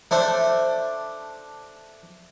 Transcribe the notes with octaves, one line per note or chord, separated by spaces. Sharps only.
A3 D4 C5